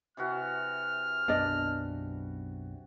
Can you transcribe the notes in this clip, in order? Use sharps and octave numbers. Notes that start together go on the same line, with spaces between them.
C3 E3 F#4 F6
B1 F#2 B3 D4 D5 D#5